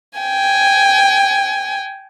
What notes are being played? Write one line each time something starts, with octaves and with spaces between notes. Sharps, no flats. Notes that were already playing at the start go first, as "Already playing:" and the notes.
G5 G#5